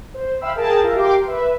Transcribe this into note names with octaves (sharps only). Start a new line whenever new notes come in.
C5
E5 F5 G5 B5 E6
G#4 A#4 G5 A5
F4 A#4 E5 F5
G4 A#4 G5 C6 D6
B4 E5